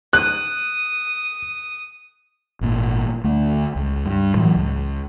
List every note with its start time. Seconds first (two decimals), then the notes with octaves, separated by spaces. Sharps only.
0.13 D#6 F#6
2.61 G#1 A#2
3.24 D2 A3
3.76 C#2
4.06 G2
4.35 A2 E3 F#3
4.56 C#2